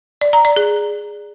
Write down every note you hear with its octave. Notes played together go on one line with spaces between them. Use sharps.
D5
A#5
D5
G#4